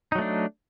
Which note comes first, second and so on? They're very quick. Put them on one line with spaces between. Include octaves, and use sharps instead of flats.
D#4 F#3 A3 D4